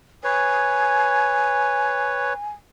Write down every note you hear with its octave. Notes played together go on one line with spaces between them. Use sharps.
B4 C#5 G#5